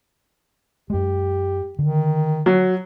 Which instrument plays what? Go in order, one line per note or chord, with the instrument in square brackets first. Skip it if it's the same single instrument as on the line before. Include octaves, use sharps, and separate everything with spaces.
[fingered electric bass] F#2 G#3 [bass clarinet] G4
[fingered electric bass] D3 [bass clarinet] D#3
[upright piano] F#3